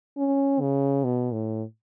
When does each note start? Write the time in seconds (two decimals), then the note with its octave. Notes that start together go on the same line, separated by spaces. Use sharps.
0.17 C#4
0.61 C#3
1.04 B2
1.33 A2